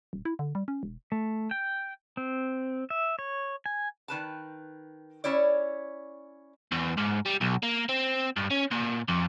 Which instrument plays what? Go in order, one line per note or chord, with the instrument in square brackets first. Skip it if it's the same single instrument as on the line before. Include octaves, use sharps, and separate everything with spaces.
[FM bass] D#1
E4
D3
G3
C#4
E1
[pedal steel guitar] A3
G5
C4
E5
C#5
G#5
[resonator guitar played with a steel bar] D#3 B4 A5
C#4 E4 C#5 D5
[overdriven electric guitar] E2
G#2
G3
B1
A#3
C4
G2
C#4
A#2
F2